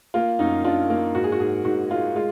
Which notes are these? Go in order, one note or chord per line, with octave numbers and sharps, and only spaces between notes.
A#3 F4
F#2 D#4
D4 F4
A#3
G#2 F#4
G#4
F#4
G#2 G#4
G#2 F#4
G#3 F4
G#3 F4